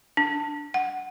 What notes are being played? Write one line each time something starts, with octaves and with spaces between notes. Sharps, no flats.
D4
F#5